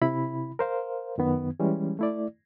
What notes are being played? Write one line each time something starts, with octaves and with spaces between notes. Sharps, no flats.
C3 E4 B5
A#4 C5 F5
F#2 D#3 B3
E3 G3 G#3 C#4
A3 E4 D5